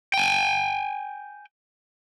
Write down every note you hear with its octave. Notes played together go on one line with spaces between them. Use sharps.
G5 G#5